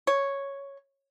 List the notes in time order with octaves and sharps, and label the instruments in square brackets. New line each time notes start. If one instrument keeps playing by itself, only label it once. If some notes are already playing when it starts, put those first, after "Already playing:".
[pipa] C#5